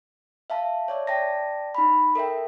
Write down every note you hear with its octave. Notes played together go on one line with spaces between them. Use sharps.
E5 F5 A5
C#5 D5 E5
D5 G5 A5 A#6
D#4 B5
A4 A#4 E5 G5